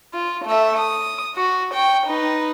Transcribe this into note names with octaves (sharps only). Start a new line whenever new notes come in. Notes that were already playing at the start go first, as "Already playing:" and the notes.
F4
A3 E5
D#6
F#4
G5 C#6
D#4 B4